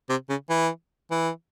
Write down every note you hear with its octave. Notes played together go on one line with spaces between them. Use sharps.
C3
C#3
E3
E3